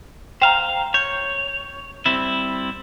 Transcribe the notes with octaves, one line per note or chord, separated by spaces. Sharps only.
C5 F5 G5 A#5
C#5 G6
G3 C4 E4